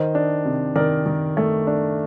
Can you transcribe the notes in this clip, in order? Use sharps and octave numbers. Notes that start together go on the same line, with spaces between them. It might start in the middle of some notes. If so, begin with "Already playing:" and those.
Already playing: D#3 C5 D#5
D4
C3
D#3 A#4 D5
D#3
A3
D4